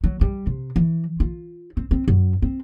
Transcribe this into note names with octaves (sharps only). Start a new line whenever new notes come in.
F#3
G3
C3
E3
F4
C4
C4
F#2
C4